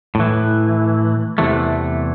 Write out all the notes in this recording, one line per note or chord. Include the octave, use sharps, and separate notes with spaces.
A2
E3
E2 C3 E3 A3